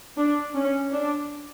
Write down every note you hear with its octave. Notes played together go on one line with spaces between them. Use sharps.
D4
C#4
D4